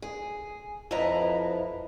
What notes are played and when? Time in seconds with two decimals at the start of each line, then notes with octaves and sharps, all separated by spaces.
0.02 G#4
0.91 F2 F3 E4 B4 D#5 A#5